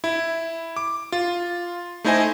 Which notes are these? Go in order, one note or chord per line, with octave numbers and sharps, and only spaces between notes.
E4
D6
F4
A3 D#4 E4 C5 D#5 G#5